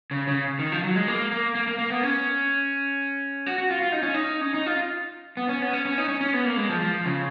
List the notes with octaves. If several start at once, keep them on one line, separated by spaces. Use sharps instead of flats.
C#3
C#3
D#3
F3
F#3
G#3
A#3
A#3
A#3
A#3
A#3
B3
C#4
F#4
F#4
F4
F4
D#4
C#4
D#4
C#4
D#4
F4
B3
C#4
B3
C#4
C#4
D#4
C#4
C#4
B3
A#3
G#3
F3
F3
C#3